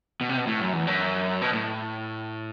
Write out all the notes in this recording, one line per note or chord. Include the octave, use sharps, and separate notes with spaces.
B2
C3
B2
A2
F#2
E2
F#2
B2
A2